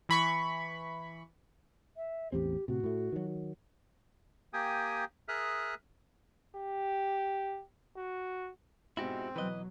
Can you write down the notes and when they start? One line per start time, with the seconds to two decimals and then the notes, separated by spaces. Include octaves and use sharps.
0.09 E3 B5 C#6
1.97 E5
2.32 A1 E2 C4 G4
2.68 A2 C3 F#4
2.84 A2 A3
3.12 D#3 F#3
4.53 A#3 G4 G5 G#5 D#6
5.28 G#4 A#4 E5 D#6 F6 F#6
6.57 G4
7.97 F#4
8.97 G#2 B2 C4 E4 F#4 G4
9.36 B2 E3 F#3 B4 D#5 F#6